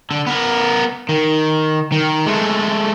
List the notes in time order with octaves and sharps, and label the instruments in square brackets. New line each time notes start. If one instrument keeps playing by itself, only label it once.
[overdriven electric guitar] D3
B3 A#4
D#3
D#3
G#3 A3